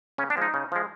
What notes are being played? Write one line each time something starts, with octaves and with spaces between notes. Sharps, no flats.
C#3 C#4
D4
F3 G#3 D#4
C#3
F3 G#3